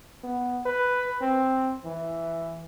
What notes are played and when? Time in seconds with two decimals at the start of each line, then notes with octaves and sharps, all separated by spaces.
0.23 B3
0.66 B4
1.21 C4
1.85 E3